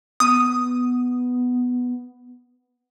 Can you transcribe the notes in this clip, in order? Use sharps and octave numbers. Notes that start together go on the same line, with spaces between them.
B3 D#6